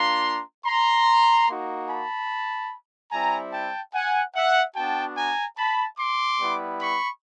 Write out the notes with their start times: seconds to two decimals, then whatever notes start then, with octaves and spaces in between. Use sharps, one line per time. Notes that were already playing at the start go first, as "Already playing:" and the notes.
Already playing: A#3 D4 F4 A#5 C6
0.65 A#5 C6
1.48 A#3 D#4 F#4
1.89 A5 B5
3.11 G3 C4 E4 G#5 A#5
3.52 G5 A5
3.93 F#5 G#5
4.35 E5 F#5
4.76 B3 D4 F#4 G5 A5
5.16 G#5 A#5
5.57 A5 B5
5.98 C6 D6
6.39 G3 B3 E4
6.81 B5 C#6